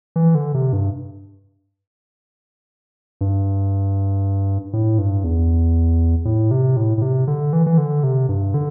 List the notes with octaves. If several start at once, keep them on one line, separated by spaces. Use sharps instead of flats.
E3
D3
C3
G2
G2
A2
G2
E2
A2
C3
A2
A2
C3
D3
E3
E3
D3
C3
G2
D3